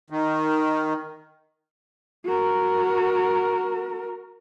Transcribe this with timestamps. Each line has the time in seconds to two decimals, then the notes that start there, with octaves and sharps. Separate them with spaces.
0.10 D#3
2.25 F#4 A#4